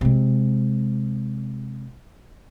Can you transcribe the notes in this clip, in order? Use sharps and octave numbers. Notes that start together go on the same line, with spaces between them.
C3 G#3